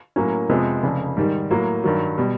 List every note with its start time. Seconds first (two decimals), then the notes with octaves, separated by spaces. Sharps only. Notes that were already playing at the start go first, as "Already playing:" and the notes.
0.16 A2 F#3 A#3 C#4
0.49 F2 C3 F3 G#3 B3
0.83 F1 F2 C#3
1.17 G#2 D#3 G3
1.51 A2 F#3 A#3
1.84 G2 D#3 F#3
2.18 B2 G3